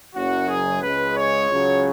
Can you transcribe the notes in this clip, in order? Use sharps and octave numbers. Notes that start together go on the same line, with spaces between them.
F#1 F#2 F#3 F#4
G#4
C#2 C#3 G#3 B4
C#5
C#2 C#3 F#3